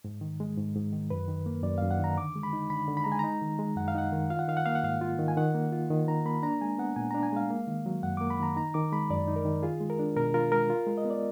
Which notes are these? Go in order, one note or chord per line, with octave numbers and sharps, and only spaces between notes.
G#2
D#3
G#3
G#2
G#2
D#3
F#2 B4
D#3
A#3
F#2 D5
F#2 F5
F#5
D#3 A#5
D3 D6
G#3
B5
D#4
D3 B5
D3
B5
G#3 A#5
G#5
D#4 A#5
D#3
G#3
F#2 F#5
F5
D#4 F#5
D#3
F4 F5
F#5
D#3 F5
F#5
A#3 F5
F#5
G#2 F5
F4
D#3
G#5
D#3 F#5
A#3
F4
D#3
D#3 A#5
A#3 B5
D4 A#5
G#3 G#5
B3 F#5
A#2 G#5
D4 A#5
G#5
G#3 F5
A#3
D#3
F#3
F#2 F#5
A#3 D6
B5
D#3 A#5
D#4 A#5
D#3 D6
G#3 B5
F#2 D5
D#4
A#4
D#3
F4 G#4
G#3
A#4
D4
B2 A#4
F4 A#4
G#3 A#4
F4
G#3
D#5
B3
D5